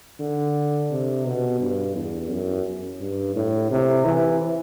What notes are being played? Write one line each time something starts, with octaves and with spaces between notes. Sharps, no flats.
D3
C3
B2
G2
E2
F#2
G2
A2
C3
E3